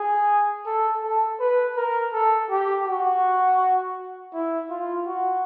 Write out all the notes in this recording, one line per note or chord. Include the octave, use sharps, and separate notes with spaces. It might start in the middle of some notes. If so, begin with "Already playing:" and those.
Already playing: G#4
A4
A4
B4
A#4
A4
G4
F#4
E4
F4
F#4